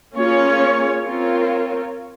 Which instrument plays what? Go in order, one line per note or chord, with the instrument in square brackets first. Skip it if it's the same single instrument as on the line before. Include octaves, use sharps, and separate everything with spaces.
[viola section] A#3 C#4 F4 G#4 C#5
C4 F4 A#4 C#5